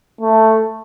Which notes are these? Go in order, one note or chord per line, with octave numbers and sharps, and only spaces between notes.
A3